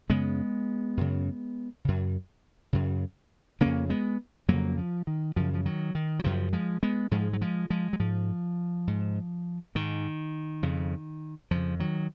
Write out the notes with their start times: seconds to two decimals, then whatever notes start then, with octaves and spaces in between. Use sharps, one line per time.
0.09 F#2 C#3 G#3 B3
0.97 F#2 C#3
1.85 F#2 C#3
2.73 F#2 C#3
3.61 F2 C#3 A#3 C#4
3.90 G#3 B3
4.48 F2 C#3 F#3 A#3
4.78 F3
5.07 D#3
5.36 F#2 C#3 F3
5.54 F3
5.66 D#3 F#3
5.95 D#3
6.19 F#3
6.24 F#2 C#3 F3
6.53 F3 G#3
6.83 G#3 B3
7.11 G#2 F3 G#3
7.33 F#3
7.41 F3 G#3
7.70 F3 G#3
7.93 F#3
7.99 G#2 F3
8.87 G#2
9.75 G#2 D#3
10.63 F2 C#3
11.51 F2 C#3 F3
11.80 D#3 F#3